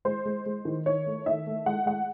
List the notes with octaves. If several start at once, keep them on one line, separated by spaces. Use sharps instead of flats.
G#3 C5
G#3
G#3
D#3
D#3 C#5
A3
D#3 E5
A3
G#3 F#5
G#3 F#5